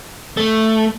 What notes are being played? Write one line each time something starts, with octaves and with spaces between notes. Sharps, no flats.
A3